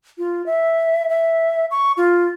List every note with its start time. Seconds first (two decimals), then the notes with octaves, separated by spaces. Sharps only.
0.18 F4
0.46 E5
1.09 E5
1.71 C#6
1.97 F4